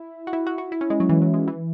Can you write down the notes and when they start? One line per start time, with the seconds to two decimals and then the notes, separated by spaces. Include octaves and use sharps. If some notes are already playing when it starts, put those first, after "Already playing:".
Already playing: E4
0.27 F#4
0.33 E4
0.47 F#4
0.58 F#4
0.72 E4
0.81 C#4
0.90 G#3
1.00 F#3
1.09 E3
1.22 F#3
1.34 G#3
1.48 E3